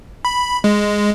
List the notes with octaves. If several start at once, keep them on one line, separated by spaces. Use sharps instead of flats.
B5
G#3